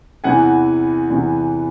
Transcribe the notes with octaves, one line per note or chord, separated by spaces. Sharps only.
E2 C3 E3 F#5 G#5
E2 C3 E3